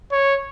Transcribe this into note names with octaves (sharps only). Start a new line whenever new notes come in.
C#5